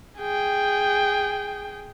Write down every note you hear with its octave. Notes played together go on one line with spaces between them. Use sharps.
G#4 G5